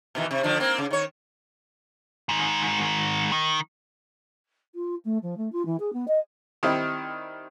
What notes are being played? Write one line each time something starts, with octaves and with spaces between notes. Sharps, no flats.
B2 D#3 E3
C3
D3 F3 D4
A#3 C4
C#3
D#3 C#5
G#2 D#3
D#3
F4
A3
F3
A3
F4
E3
G#4
B3
D#5
D#3 G3 C4 D#4 E4